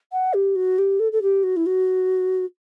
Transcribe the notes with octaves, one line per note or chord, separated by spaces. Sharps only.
F#5
G4
F#4
G4
A4
A4
G4
F#4
E4
F#4